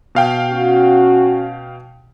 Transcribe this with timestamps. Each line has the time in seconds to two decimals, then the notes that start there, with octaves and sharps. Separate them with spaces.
0.15 B2 F5 G5
0.51 C#4 F#4